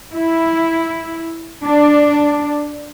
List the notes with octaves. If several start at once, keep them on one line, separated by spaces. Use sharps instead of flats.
E4
D4